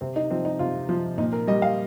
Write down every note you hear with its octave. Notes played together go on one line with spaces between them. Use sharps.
C3 C4
D#4
F3 C4
D#4
C3 F4
F3
A#2 D#4
A#4
G3 D#5
F5